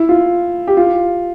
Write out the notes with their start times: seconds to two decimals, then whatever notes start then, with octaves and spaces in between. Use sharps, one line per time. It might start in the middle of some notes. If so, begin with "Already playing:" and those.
Already playing: E4
0.09 F4
0.68 G4
0.77 F4